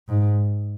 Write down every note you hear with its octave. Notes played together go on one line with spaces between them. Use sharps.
G#2